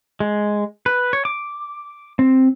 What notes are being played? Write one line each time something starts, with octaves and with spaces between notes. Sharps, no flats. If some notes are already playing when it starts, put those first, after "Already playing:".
G#3
B4
C#5
D6
C4